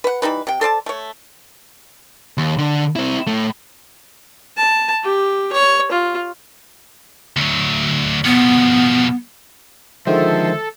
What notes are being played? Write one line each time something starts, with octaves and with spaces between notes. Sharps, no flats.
B4 F#5
E3 G3 D#4 B4
C3 G5
A4 C5 D5 A5
A3 C#5
D#2
D3
C4 E4
A2 A3
A5
G4
C#5
F4
D2 F#3
B2 F3 B3
D3 D#3 F3 G#3 A4 C5 E5